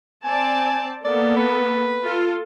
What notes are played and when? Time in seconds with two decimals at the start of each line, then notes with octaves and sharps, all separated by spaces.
0.24 C4 D5 G#5 A5
1.05 A#3 B3 A4 D5
1.36 B4
2.03 F4 A4